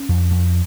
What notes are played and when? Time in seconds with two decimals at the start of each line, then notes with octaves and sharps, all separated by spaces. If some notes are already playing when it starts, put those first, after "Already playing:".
Already playing: C#4
0.09 F2
0.31 F2